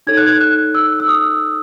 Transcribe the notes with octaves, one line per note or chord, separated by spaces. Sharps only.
D#4 A4 C#5 G#6
F#6
G#6
F#6
E6
E6
D#6